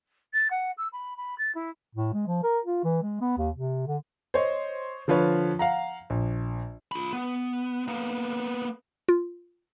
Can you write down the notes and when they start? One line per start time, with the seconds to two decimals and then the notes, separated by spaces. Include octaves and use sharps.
0.33 A6
0.50 F#5
0.77 E6
0.93 B5
1.17 B5
1.38 A6
1.55 E4
1.95 A2
2.13 G#3
2.27 F3
2.43 A#4
2.64 F4
2.84 E3
3.02 G#3
3.21 B3
3.38 D#2
3.56 C3
3.87 D3
4.34 C5 C#5 D#5
5.08 D3 F3 F4 B4 C#5
5.59 F5 F#5 A#5
6.10 A#1
6.92 F4 B5
7.13 B3
7.88 A#3 B3
9.09 F4